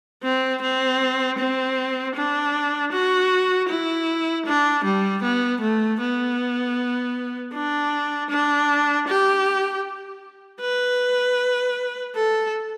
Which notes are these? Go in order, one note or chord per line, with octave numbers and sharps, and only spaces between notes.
C4
C4
C4
D4
F#4
E4
D4
G3
B3
A3
B3
D4
D4
G4
B4
A4